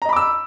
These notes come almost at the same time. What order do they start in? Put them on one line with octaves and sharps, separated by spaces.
A#5 D#5 B5 D6 E6